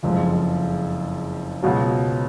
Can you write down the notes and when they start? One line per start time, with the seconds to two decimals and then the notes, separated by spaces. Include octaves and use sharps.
0.03 F#1 F2 F3 G#3
1.63 C#2 B2 F#3